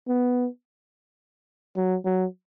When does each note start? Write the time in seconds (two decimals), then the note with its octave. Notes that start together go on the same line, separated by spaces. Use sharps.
0.08 B3
1.77 F#3
2.05 F#3